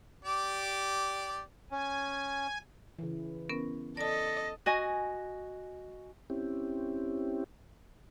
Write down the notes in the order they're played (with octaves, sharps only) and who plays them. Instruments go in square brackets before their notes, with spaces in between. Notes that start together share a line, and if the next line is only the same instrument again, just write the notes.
[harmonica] G4 D5
[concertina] C#4 [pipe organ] G#5
[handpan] C#3 E3
[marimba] B3 C#4 A#4
[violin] A4 D#5 [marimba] D5 A5 [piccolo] A#6
[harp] F#4 D#5 G#5
[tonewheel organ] C4 C#4 E4 G4